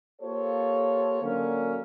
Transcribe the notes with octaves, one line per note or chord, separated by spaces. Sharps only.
A#3 F4 G4 A4 C5 C#5
D3 F#3 A#3 C#4